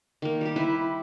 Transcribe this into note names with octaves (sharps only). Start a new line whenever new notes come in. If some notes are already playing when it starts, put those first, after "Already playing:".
D#3 A#3
G3 G4
E4 B4 C5